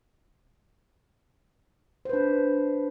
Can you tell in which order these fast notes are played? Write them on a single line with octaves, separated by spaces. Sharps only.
C5 B4 D4